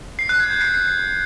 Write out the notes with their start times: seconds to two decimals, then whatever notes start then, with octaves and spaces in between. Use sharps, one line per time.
0.19 C7
0.29 F#6
0.40 G#6
0.50 G6
0.61 C7